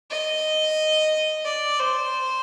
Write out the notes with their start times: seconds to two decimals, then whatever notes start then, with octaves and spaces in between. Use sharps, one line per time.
0.11 D#5
1.45 D5
1.79 C5